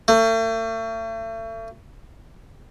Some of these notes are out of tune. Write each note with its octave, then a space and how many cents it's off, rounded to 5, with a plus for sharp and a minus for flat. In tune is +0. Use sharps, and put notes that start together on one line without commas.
A3 +40